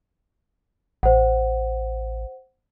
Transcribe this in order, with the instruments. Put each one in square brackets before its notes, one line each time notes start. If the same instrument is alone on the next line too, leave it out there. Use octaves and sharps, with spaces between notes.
[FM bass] A1 [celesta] C5 F#5